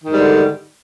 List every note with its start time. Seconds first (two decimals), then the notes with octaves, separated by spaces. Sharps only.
0.03 D#3
0.08 G#2
0.13 G3
0.18 D3